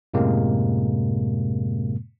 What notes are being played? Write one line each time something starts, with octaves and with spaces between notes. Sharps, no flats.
F#2 A2 C3 G#3 A#3